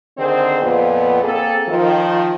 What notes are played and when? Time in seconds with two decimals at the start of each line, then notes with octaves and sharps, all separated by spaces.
0.18 D3 D#3 C4 G#4 C5
0.62 F2 A#2 B3
1.23 A#3 C4 G#4 A4
1.68 D#3 F3